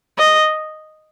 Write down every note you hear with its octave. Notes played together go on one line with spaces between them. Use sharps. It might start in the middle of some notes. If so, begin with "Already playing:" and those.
D#5